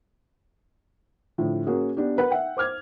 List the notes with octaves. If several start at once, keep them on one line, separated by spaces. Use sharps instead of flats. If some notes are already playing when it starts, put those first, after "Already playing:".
A2 D3 F3
A#3 C#4 F#4 G#4
B3 D4 G4
A#4 B4 F#5
E5 F#5 G5
C5 D6 F6 G#6